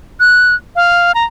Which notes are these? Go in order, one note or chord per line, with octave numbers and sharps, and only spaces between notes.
F#6
F5
A#5